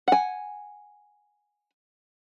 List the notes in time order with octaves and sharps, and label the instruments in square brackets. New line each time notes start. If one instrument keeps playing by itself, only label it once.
[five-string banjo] F#5 G#5